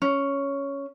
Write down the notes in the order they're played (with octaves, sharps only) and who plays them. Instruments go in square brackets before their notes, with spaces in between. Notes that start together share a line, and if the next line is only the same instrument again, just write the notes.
[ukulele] C#4